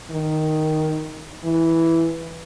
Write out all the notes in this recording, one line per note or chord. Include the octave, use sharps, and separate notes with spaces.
D#3
E3